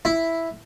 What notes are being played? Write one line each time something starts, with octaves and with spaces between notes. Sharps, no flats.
E4